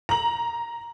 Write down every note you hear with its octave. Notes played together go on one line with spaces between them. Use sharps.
A#5 F#7